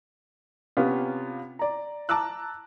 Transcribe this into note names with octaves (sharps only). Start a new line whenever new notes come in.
C3 B3 C#4 F4 G4
D5 A#5
A5 A#5 D6 E6 F#6